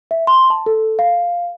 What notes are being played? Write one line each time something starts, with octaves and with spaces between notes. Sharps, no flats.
E5
C6
A5
A4
F5